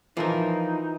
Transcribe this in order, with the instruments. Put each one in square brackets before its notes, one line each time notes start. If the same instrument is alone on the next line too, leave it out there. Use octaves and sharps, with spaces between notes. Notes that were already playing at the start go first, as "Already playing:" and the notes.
[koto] E3 [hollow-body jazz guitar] F3 A#4 [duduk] D#4